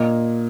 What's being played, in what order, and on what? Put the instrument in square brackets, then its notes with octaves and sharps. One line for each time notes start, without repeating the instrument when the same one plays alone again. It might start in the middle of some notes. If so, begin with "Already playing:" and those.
Already playing: [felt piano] A#2 A#3 D#5